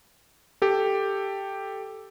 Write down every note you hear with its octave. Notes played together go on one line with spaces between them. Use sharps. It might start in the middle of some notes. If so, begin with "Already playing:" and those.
G4 A4